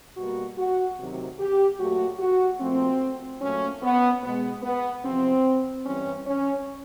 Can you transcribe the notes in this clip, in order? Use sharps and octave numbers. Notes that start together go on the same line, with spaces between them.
B2 G3 A#3 F#4
F#4
D2 C3 D#3 F#3
G4
A#2 F#3 A3 F#4
F#4
A#2 F3 A3 C4
A#2 F#3 A3 C#4
B3
B2 G#3 B3
B3
E2 C3 F3 C4
G2 E3 G3 C#4
C#4